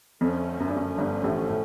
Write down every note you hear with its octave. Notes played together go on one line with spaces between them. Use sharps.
F2 D3 F3 A3 C#4
F#2
G2
F#2
G1 G2
A1 A2
A2